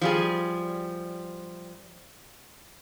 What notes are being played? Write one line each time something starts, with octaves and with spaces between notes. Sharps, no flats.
F3 G3 G#4